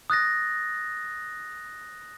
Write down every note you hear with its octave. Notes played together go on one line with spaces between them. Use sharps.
D#6 F#6 A6 A#6